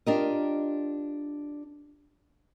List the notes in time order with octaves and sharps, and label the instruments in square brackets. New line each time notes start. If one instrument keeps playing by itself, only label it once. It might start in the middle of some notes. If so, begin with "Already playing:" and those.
[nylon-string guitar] D4 F4 G4 A#4 D#5